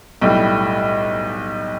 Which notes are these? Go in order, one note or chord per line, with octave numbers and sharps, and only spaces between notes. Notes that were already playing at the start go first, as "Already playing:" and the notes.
B1 A2 G3